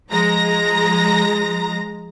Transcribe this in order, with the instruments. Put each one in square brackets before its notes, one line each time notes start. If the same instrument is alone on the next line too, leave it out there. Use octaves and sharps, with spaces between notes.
[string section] F3 G#3 A#5 A#6